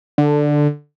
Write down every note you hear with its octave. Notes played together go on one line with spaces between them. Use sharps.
D3